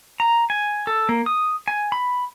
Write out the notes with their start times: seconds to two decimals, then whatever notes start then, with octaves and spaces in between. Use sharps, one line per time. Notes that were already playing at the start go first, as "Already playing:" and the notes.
0.20 A#5
0.50 G#5
0.87 A4
1.09 A#3
1.26 D#6
1.68 G#5
1.92 B5